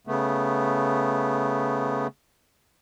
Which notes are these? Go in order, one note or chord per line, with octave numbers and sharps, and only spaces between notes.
C#3 A3 B3